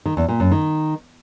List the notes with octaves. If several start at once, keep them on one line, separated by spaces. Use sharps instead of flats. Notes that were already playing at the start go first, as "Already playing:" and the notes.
D#3
E2
A#2
F#2
D#3